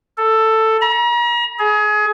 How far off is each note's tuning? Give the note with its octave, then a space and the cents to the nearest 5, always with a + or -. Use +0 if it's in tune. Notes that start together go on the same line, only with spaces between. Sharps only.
A4 +10
A#5 +40
G#4 +25